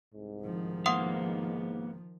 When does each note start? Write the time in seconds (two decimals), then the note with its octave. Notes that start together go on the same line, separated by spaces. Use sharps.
0.14 C2 G#2
0.43 D#3 F3
0.86 A#3 B3 F5 F#5 C6 D#6